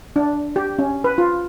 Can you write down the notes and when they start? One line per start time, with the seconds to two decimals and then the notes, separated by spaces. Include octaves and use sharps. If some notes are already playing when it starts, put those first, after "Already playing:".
0.16 D4
0.56 G4
0.79 C#4
1.04 B4
1.18 F4